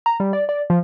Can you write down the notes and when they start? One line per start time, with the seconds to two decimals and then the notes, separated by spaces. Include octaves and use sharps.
0.06 A#5
0.20 G3
0.33 D5
0.49 D5
0.70 F3